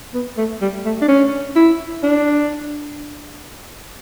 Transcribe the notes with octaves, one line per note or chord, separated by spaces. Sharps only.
B3
A3
G3
A3
D4
C#4
E4
D4